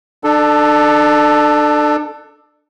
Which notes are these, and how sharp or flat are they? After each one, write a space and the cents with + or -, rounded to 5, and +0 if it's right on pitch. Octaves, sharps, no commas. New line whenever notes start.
D4 +30 A4 +0